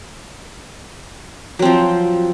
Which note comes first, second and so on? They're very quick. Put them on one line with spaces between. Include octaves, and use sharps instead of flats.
F#3 C4 F3